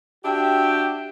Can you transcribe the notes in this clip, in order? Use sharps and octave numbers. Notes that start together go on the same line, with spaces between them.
D4 F#4 G4 E5 G5